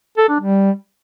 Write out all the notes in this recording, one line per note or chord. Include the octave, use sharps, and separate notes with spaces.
A4
D4
G3